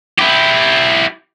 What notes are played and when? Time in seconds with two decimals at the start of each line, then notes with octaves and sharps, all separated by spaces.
0.19 E4 G4